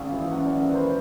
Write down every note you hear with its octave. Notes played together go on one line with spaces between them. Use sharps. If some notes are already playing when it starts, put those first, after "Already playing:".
Already playing: G#1 C#3 F5
E3 F5
F#2 F#5
D5
C#3
A#4
G#1 B4
C5